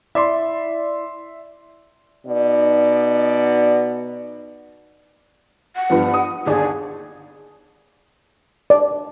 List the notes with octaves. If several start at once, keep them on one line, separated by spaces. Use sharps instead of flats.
E4 D5 E5 C6
B2 D#4 D5
F#5
G2 F3 B3
D#6
G1 D#2 G#4 D5
D5